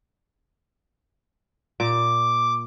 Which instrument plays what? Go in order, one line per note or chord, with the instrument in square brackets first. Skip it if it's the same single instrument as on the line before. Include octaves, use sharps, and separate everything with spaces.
[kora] A#2 [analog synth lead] D6